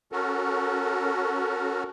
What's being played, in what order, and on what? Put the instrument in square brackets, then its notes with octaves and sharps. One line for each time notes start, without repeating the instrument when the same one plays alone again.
[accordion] C#4 F#4 A4 A#4